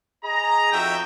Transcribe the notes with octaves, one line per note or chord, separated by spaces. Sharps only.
G#4 D#5 A#5
F2 D#4 F#4 E5 G5